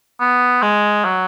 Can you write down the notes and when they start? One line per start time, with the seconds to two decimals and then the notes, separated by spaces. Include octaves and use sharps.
0.20 B3
0.62 G#3
1.05 F#3